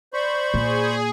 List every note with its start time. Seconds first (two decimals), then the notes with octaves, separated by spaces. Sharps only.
0.14 C5 D5 B5 C#6
0.54 A#2 G#4